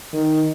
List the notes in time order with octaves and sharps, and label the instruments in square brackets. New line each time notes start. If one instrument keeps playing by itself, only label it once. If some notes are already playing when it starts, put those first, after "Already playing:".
[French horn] D#3